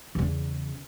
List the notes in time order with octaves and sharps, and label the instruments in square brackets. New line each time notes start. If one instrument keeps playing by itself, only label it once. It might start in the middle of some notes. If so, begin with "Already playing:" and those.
[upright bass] E2 C#3